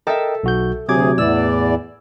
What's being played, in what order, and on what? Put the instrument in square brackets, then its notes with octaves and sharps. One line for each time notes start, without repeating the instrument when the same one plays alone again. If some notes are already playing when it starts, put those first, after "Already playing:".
[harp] A4 E5 [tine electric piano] A#4 D#5 G5
[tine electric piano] B1 F#4 G6
[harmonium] D2 G#4 [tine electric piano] C3 F#3 [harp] D6 G#6
[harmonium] E2 E3 D5 [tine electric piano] A2 [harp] E6